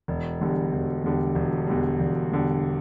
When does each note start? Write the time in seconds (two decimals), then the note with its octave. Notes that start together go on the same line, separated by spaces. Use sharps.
0.08 E1
0.41 E2 D3 G3
0.73 E1
1.04 E2 D3 G3
1.35 E1
1.67 E2 D3 G3
2.00 E1
2.31 E2 D3 G3